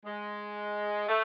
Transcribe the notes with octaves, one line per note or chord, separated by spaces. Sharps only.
G#3
A3